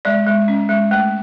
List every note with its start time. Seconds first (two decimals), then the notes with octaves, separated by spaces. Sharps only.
0.05 G#3 D5
0.27 G#3
0.48 C#4
0.69 G#3
0.91 A3